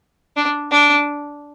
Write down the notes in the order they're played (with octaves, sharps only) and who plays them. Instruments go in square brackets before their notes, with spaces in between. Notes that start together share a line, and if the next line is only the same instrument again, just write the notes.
[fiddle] D4
D4